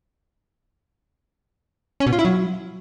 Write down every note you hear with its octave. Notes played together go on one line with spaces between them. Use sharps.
C#4
B2
F4
E4
F#3